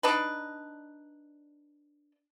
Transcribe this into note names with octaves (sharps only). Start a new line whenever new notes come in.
D4 D#4 B4